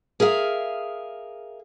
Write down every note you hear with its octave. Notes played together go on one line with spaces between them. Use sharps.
G#4 A#4 E5 F5